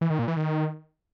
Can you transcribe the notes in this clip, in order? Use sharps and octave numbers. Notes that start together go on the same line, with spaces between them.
E3
D#3
A#2
E3
D#3